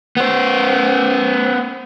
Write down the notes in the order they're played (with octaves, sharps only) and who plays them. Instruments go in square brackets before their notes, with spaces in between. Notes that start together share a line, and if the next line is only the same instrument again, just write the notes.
[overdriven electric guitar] B3 C5